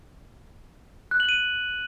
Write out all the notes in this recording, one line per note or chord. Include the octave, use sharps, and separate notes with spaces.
F#6
F#7
D#7